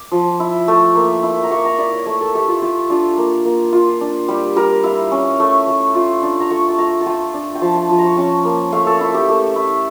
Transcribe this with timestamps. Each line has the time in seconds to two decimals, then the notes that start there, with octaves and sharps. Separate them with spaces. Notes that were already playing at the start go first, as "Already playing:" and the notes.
Already playing: D6
0.12 F3
0.40 E4
0.68 A3
0.95 A#3
1.23 E4
1.43 A#5
1.51 A#3 C#6
1.65 A#5
1.78 E4 D5
1.93 C#5
2.06 A3 A#4
2.21 A4
2.35 A3 G4
2.48 F4
2.62 F4 G4
2.90 D4 F4
3.17 A#3
3.45 A#3
3.73 F4
4.01 D4
4.28 G3 G4
4.56 G3 A#4
4.84 E4 F5
5.11 C#4
5.40 A3
5.68 A3
5.95 F4
6.23 D4
6.40 A#5
6.50 A3 C#6
6.68 A5
6.78 A3 A#5
7.01 A5
7.06 F4 G5
7.34 D4
7.55 G5
7.61 F3 A5
7.75 A5
7.89 F3
7.98 A#5
8.04 C#6
8.17 C#4 A5
8.45 A#3
8.72 A3 F5
8.87 A4
9.01 E4
9.14 G4
9.28 A3
9.56 E4